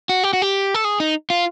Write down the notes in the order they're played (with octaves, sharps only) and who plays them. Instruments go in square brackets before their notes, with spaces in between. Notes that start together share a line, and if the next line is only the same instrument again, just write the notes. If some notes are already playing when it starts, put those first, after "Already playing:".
[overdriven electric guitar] F#4
G4
F#4
G4
A4
G#4
D#4
F4